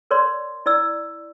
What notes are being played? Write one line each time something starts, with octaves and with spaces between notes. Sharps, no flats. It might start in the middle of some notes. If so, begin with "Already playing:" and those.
A#4 C#5 D5 C6
E4 D5 E6